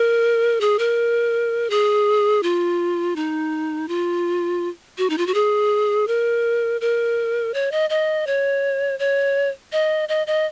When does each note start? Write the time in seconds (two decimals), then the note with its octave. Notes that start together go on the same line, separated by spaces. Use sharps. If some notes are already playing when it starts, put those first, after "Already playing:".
Already playing: A#4
0.61 G#4
0.79 A#4
1.70 G#4
2.43 F4
3.16 D#4
3.88 F4
4.98 F#4
5.10 D#4
5.18 F4
5.27 F#4
5.34 G#4
6.07 A#4
6.81 A#4
7.54 C#5
7.72 D#5
7.90 D#5
8.27 C#5
8.99 C#5
9.72 D#5
10.09 D#5
10.27 D#5